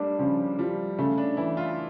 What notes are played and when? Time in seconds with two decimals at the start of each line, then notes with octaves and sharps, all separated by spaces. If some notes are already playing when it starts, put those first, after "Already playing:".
Already playing: G3 A3 A#3 D4
0.19 C#3 F3
0.59 F3 G3
0.98 C#3 A3
1.18 D4
1.37 E3 E4
1.57 F4